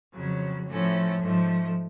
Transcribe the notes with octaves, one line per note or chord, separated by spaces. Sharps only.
F2 C#3 F#3
A2 F3 A3 C#4
G#2 F3 A3